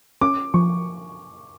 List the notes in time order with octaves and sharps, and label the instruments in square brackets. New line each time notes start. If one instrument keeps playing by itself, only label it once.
[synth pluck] C#4 [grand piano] D6
[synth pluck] F3 [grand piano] C#6